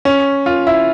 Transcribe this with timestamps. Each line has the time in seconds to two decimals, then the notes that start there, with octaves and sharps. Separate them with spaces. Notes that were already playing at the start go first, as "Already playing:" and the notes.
0.05 C#4
0.46 F4
0.67 E4